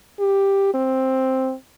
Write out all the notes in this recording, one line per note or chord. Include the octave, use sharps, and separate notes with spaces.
G4
C4